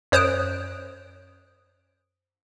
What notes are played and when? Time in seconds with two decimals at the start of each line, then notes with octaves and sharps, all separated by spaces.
0.12 F#2 C5 C#5 D#6 F#6 D7